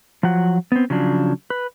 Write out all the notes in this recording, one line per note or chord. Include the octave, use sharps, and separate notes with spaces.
F3 F#3 F#5
B3 C4
C#3 F3 F#3 D4
B4